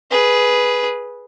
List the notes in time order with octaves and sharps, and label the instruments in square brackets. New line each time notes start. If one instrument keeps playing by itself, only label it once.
[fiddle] G#4 B4